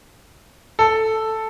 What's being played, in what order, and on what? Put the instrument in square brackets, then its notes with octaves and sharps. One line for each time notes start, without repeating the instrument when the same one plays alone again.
[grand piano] A4